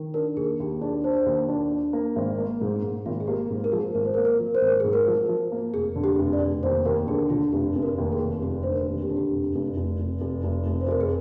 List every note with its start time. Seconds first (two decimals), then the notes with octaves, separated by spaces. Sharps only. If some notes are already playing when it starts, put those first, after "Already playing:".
Already playing: D#3
0.14 D4 A#4
0.37 D#2 G#4
0.60 D#2 G4
0.81 D4 G#4
1.04 D4 C5
1.26 D#2
1.49 D4
1.71 D4
1.93 A#3
2.16 G#1 C5
2.38 A#3
2.45 A#4
2.61 G#2
2.76 G#4
2.83 G#2
3.06 G#1 F4
3.20 G#4
3.27 A#3 G4
3.50 G#2
3.64 A#4
3.72 F3 G#4
3.95 G#1 A#4
4.05 C5
4.14 A#4
4.17 A#3
4.25 A#4
4.39 F3
4.55 C5
4.61 G#1
4.67 A#4
4.80 G#2 G#4
4.93 A#4
5.07 F3
5.29 F3
5.52 A#3
5.74 F1 G#4
5.96 D3
6.04 G4
6.18 F1
6.33 D5
6.41 F1
6.63 D#2 C5
6.86 D#2 A#4
7.07 D3 G#4
7.30 D3 F4
7.53 F1 G4
7.75 F1
7.82 A#4
7.98 D#2
8.12 G#4
8.20 D#2
8.42 F1 G4
8.63 D3 C5
8.72 A#4
8.87 D#2
9.02 G4
9.10 D3 F4
9.17 G4
9.32 F1
9.55 F1
9.76 F1
9.99 F1
10.21 F1
10.44 F1
10.66 F1
10.81 C5
10.88 F1 A#4
11.01 G#4